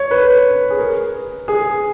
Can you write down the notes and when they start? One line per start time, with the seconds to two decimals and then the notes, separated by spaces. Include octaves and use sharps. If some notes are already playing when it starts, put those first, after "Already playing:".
Already playing: C#5
0.11 B4
0.70 G#4
0.79 A#4
1.48 G#4